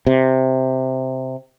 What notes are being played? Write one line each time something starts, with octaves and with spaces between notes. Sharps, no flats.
C3